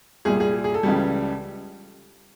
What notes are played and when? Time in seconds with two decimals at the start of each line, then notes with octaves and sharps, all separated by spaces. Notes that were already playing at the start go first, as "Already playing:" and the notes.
0.25 C2 A#2 G3 G#4
0.40 G#4
0.64 G#4
0.74 A4
0.83 C#2 C#3 E3 G3